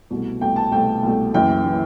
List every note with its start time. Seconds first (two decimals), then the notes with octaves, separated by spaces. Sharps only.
0.10 C2 B2 A3
0.41 C2 B2 A3 G5
0.56 A5
0.72 C2 B2 A3 G5
1.02 C2 B2 A3
1.34 F#1 F#2 E3 G5
1.65 E3